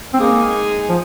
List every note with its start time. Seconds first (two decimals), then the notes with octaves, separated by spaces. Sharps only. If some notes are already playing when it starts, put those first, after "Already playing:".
0.14 C4
0.20 G#3 A#3 D#4 G#4
0.89 F3